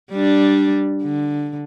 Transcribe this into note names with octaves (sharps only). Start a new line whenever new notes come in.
G3 D4
D3